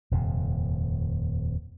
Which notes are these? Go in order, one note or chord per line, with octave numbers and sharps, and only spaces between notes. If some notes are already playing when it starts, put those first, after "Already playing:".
D#1 F2 C3